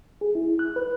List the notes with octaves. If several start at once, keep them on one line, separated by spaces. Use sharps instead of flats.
G#4
E4
F#6
B4